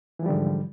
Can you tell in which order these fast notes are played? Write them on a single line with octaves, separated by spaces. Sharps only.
E3 F3 G3 D3 G#2